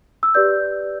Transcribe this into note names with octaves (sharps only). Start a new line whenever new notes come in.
E6
G4 B4 D5 G6